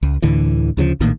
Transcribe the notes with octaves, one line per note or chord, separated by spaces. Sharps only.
C#2
D2 A2 D3 E3
D2 C#3 E3 F3
A#1 A2 D#3 A#3